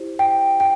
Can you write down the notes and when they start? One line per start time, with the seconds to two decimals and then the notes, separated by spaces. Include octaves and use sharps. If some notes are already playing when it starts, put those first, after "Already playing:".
Already playing: E4 G4 C5
0.19 G5
0.60 G5